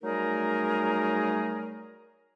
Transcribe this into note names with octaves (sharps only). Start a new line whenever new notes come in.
F#3 G3 A3 D#4 G#4 A#4